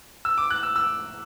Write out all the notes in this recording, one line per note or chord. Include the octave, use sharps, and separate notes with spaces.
E6
D6
F#6
E6
E6